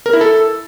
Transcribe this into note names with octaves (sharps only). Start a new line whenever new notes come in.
A#4
E4
A4